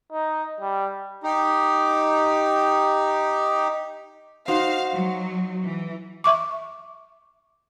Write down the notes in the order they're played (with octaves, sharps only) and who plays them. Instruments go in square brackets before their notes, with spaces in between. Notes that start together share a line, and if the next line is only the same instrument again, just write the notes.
[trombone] D#4
G3
[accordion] D#4 G4
[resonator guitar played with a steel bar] D#4 F#4 C5 [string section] F5
[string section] F#3
E3
[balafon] E5 C#6 D6